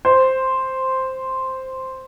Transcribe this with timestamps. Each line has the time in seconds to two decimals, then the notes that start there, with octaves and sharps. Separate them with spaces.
0.05 C5